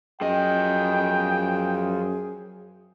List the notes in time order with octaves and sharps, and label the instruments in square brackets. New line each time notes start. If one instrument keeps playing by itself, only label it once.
[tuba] F#2 [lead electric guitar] F3 D#5 [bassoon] G#4 [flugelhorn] G5